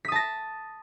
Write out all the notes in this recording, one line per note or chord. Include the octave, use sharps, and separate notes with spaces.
A5 D#6 A#6 B6